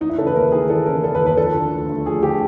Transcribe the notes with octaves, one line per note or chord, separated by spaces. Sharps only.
E3 D#4
E4
C#3 A4
B4
D#2 A#4
D#2 G#4
E3 A4
C#3 A#4
D#2 A4
B4
D#2
B4
F3 A4
D3
D2
A3
F3 G#4
D3 G4